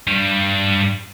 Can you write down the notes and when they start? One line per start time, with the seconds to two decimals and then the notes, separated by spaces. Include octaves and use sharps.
0.07 G2 G3